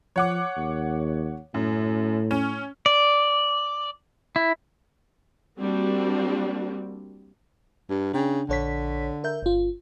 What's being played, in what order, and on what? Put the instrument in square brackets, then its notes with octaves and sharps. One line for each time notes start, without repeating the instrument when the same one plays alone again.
[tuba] F3 [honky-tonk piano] C#5 F#5 D6
[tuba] D#2
[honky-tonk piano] F#2 [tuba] A2
[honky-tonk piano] C#4
[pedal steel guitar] D5
E4
[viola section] G3 A#3 C4 D4 F#4
[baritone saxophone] G2
[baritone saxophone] C#3 [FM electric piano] D4 G5
[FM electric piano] A#1 C#5 B6 [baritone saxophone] D3
[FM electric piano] A#4 E5 G6
G1 F4